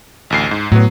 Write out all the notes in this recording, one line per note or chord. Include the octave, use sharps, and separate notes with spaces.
A1 D2 C7
G#2
A2 F#3 B3